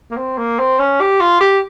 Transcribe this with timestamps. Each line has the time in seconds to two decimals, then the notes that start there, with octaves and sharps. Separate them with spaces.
0.11 A#3
0.17 C4
0.38 A#3
0.59 C4
0.79 C#4
1.00 G4
1.20 F4
1.40 G4